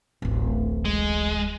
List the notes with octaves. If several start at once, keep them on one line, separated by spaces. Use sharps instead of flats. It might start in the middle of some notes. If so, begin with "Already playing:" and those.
D1 A1
G#3